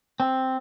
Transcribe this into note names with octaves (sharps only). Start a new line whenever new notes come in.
C4